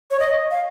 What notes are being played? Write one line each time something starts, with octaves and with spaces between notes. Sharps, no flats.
C#5
D#5
F5